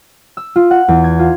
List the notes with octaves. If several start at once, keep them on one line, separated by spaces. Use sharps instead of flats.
E6
F4
F#5
E2
G#6
F4